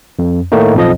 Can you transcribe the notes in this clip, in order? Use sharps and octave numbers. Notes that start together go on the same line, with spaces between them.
F2
A2 D#3 A3 A#3 D#4
B1 F2 F3 D#5